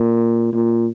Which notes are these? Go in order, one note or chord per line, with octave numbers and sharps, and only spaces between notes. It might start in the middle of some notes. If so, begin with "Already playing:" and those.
Already playing: A#2
A#2